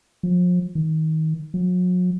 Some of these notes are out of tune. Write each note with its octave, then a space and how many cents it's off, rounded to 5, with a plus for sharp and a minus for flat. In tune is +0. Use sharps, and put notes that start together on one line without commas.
F3 +35
D#3 +25
F#3 -40